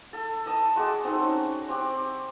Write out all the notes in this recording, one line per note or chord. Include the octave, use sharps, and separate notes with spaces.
A4
D#5 A5 D#6
G#3 F#4 G#4 D5
C4 D#4 F#4 A4
C#4
C4 G4 D5